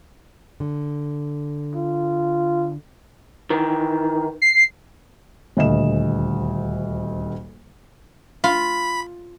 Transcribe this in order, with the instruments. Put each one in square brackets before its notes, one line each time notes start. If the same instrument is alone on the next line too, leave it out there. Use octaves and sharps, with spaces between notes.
[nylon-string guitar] D3
[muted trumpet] F4
[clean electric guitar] D#3 E3
[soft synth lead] C7
[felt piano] D#1 D2 D#5 E7
[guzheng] F4 [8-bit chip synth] B5